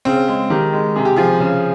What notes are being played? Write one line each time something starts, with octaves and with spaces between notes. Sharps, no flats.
C#3 C4
G#3
D#3 G4
G#3
C3 G#4
G4
F3 G#4
C#3